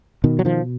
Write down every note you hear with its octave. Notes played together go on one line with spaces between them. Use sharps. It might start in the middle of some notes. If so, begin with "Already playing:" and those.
B2 D#3
F#3
D#3 F3